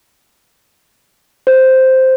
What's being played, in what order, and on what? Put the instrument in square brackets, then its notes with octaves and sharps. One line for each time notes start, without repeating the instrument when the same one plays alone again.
[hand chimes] C5